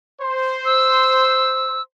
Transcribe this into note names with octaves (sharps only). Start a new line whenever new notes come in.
C5
E6